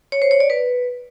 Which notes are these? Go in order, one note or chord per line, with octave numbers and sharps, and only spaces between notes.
C#5
C5
C#5
D5
B4